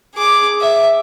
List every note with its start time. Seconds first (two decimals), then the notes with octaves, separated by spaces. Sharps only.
0.15 G#4 D6
0.61 E5